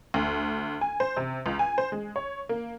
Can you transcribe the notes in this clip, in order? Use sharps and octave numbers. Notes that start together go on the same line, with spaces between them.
D2
G#5
C5
C3
C#2
G#5
C5
G#3
C#5
A#3